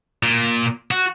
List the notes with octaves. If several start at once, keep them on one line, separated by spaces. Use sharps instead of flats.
A#2
F#4